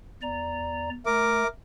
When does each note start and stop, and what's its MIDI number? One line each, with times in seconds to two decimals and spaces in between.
0.22 0.89 40
0.22 0.89 74
0.22 0.89 82
1.06 1.44 57
1.06 1.47 70
1.06 1.47 86